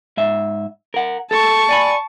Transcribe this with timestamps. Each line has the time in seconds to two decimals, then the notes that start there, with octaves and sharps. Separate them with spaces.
0.17 G#2 E5
0.94 A#4 F#5
1.31 A4 A5 C#6
1.69 D5 G#5 B5